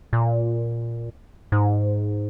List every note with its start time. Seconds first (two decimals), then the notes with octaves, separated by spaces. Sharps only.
0.13 A#2
1.52 G#2